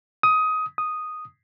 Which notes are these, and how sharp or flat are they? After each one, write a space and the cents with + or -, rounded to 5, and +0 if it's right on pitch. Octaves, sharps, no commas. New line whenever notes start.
D#6 +15
D#6 -5